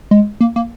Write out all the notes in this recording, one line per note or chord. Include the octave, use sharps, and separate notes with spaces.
G#3
A#3
A#3